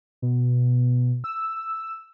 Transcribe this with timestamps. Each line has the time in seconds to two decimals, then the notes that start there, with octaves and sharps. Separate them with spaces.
0.22 B2
1.24 E6